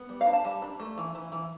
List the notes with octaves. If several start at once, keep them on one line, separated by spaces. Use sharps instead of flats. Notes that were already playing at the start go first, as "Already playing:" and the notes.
Already playing: B3
G3
F5
D4
A5
G3 A5
D4
A3
E3
E3
E3